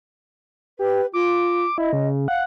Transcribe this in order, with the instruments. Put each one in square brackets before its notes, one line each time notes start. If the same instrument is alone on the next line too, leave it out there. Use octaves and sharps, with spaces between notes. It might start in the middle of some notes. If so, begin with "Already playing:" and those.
[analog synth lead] G4 [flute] B4
[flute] F4 [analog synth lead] D6
[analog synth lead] E4 [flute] D#5
[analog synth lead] C#3
[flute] F5 [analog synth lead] F#5